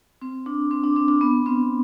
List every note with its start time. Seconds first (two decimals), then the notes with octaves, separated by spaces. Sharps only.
0.22 C4
0.46 D4
0.71 C4
0.84 D4
0.96 C4
1.08 D4
1.21 B3
1.46 C4